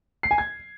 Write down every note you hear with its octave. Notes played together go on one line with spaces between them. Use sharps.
C7
G#5
G#6